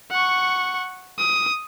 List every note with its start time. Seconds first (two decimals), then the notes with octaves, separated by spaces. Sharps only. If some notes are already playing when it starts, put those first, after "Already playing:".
0.11 F#5 C#6
1.19 D#6